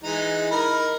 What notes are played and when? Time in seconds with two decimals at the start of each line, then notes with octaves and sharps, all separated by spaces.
0.04 E3 G#3 D#4
0.51 D#4 A#4 B5